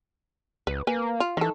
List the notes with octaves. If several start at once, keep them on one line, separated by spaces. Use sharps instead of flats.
C#2 B4
A#3 B4 G#5
F4
D#3 E3 A4